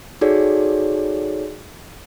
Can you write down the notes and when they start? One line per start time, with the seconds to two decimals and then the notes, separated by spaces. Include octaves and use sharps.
0.21 D#4 F#4 G#4 A4 C#5 D5